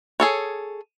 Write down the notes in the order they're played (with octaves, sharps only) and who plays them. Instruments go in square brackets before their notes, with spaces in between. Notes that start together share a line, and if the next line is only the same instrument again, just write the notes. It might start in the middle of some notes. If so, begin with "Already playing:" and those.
[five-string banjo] G#4 A4 C#5